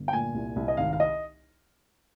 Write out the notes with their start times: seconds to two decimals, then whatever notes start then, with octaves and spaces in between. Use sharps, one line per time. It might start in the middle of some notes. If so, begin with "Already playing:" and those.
Already playing: G1
0.08 G5
0.13 A#2 G#5
0.34 C2
0.56 C2
0.68 D#5
0.77 G#1 F5
0.93 F5
1.00 D#5